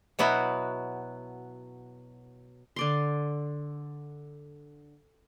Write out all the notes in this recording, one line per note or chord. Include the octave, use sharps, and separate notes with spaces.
B2 F#3 B3 E4 F#4
D3 D5 C6